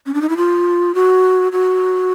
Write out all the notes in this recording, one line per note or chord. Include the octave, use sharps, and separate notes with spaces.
C#4
D4
D#4
E4
F4
F#4
F#4